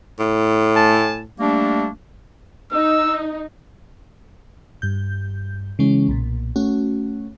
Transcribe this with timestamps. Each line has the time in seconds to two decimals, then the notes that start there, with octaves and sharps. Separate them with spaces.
0.19 A2
0.75 A3 G#5 A5
1.40 G3 A3 A#3 D4
2.72 D#4 E6
4.82 G2 G6
5.79 C#3 E3 G#3 C#4
6.08 B1 A#2
6.56 A3 C#4 F#4